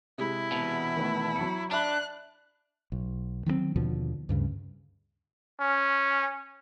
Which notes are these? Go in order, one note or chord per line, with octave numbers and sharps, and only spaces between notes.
C3 G#3 E4
E2 B2
D#3 A3 B4
F#3 C#7
D4 D5 E5 B5 F#6
B1
D#3 F#3 G3 C4
D#2 B2 D3 F3
D2 G2 C#3
C#4